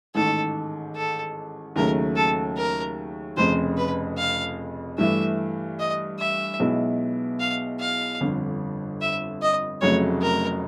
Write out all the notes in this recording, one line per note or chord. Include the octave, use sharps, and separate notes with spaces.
A1 G#2 D#3 A4
A4
D#2 C#3 F#3 A3 A#4
A4
A#4
F1 F2 C#3 C5
B4
F5
G2 E3 A3 E5
D#5
E5
B1 B2 G#3 B3 E4
F5
F5
G1 F2 D3
E5
D#5
F1 F2 C#3 F#3 A3 C#5
A#4